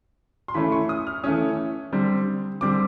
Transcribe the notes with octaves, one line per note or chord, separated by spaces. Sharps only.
C6
E3 A3 C#4 B5
C#6
D#6
F6
E3 A3 C#4 D#6
D3 G3 C4
D3 G3 C4 D6